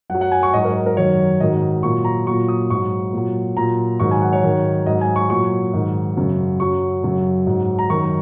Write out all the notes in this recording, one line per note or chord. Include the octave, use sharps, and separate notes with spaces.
F#2 F#3 F#5
F#5
G#5
C#6
G#2 F#3 D#5
A#4
A#4
F#2 D#3 F#3 C#5
G#2 D#3 F#3 D#5
A#2 F#3 C#6
A#5
A#2 F#3 C#6
D#6
G#2 F#3 C#6
A#2 F#3
A#2 F#3 A#5
G#2 D#3 F#3 C#6
G#5
F#5
C#5
G#2 D#3 F#3
G#2 F#3 D#5
G#5
C#6
A#2 F#3 C#6
G#2 D#3 F#3
F#2 C#3 F#3
F#2 F#3 C#6
F#2 C#3 F#3
G#2 F#3
A#5
F#2 D#3 F#3 C#6